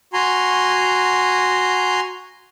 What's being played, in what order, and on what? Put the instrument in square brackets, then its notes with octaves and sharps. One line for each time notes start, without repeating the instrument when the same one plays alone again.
[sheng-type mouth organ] F#4 G#5 A#5 C6